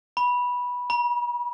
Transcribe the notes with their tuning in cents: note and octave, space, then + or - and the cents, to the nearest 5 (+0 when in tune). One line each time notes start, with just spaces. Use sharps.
B5 -10
B5 -40